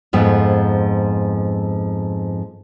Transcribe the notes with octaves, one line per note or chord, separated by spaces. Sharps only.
F2 G#2 F3 B3